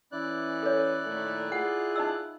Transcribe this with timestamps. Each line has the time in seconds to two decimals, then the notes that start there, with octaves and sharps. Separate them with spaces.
0.12 E3 C#4 E4 D5 F#6
0.63 A4 C#5
1.06 A#2 D#3 A3
1.52 F4 G#4 F#5
1.96 D#4 D#5 E6